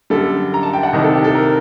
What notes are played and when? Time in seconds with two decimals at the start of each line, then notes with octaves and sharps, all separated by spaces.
0.10 F#2 D3 G3 A4
0.54 A#5
0.63 A5
0.73 G5
0.83 F#5
0.93 C2 C3 D#3 D#5
1.03 A4
1.14 G4
1.24 A4
1.35 A#4